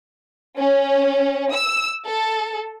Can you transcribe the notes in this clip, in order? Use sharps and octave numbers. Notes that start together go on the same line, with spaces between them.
C#4
E6
A4